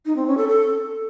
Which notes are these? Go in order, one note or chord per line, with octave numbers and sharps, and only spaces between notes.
D#4
C4
C#4
A4
A4